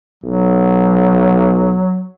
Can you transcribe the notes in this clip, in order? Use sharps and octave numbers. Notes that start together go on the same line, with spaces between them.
B1 F#3